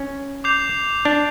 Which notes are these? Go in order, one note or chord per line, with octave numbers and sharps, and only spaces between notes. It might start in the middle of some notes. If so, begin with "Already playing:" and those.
Already playing: C#4
D6 G6 C7 F7
D4